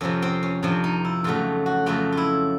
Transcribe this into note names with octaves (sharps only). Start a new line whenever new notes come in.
F2 C3 F3 C#4
C4
C#4
F2 C3 F3 D4
D#4
E4
F2 C#3 F#3 A3 F4
F#4
F2 C#3 F#3 A3 F4
E4 F4